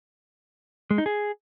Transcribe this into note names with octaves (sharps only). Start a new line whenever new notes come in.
G#3
D#4
G#4